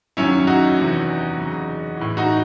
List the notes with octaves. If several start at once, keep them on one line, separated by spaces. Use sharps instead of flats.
F#2 D#3 F#3 C#4 E4
D#4 F#4
E2 C3 E3
E2 C#3 F#3
A2 E3
D#4 F#4